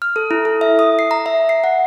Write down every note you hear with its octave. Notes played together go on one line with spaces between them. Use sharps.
F6
A4
E4
A4
E5
D#6
C7
A#5
E5
C7
F#5